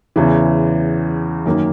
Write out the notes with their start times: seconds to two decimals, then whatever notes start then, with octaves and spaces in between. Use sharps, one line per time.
0.16 E2 C#3 E3
1.46 F#2 D#3 A#3